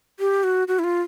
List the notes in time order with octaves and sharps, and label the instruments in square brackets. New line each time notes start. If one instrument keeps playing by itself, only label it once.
[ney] G4
F#4
F#4
E4
F4